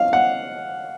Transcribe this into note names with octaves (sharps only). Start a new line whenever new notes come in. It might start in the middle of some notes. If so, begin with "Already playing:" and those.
Already playing: F5
F#5